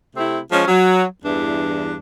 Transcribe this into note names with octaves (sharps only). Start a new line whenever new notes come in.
C3 A3 C4 E4
F3 G#3 C#4
F#3
E2 G2 E3 D4